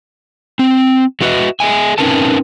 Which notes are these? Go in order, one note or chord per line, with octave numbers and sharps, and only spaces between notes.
C4
F#3 A3 F#4 B4 D#5 E5
G#4 D#5 E5 G#5
C4 C#4 D#4 A#4 B4 A5